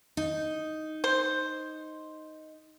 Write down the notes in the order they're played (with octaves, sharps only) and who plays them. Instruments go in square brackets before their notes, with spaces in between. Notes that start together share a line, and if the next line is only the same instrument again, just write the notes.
[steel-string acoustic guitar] D#4
[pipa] C5